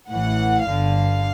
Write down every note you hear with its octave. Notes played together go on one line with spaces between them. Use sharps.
A1 A2 E3 F#5
G1 G2 D3 F5